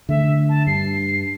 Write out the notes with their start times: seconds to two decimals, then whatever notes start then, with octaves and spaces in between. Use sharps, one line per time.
0.09 D3 A3 E5
0.49 A5
0.67 G2 C7